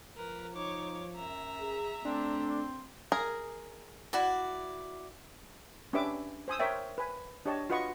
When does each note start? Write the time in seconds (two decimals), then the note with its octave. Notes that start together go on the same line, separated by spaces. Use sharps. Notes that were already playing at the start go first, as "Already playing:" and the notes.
0.16 F3 A#4 B4
0.54 D#4 C#5 D6
1.16 F#2 E5 A#5
1.60 G#4
2.05 A3 C4 D4
3.12 G#4 A#4
4.13 E4 F#4 D5
5.93 C#4 D4 G4 B4 E5 D6
6.48 C5 G#5 D#6 E6
6.59 A#4 C5 C#5 E5 G5
6.98 B4 G#5
7.46 D4 G4 C#5 D#5 A5
7.70 F4 F#4 B4 D#5 F#5 C#6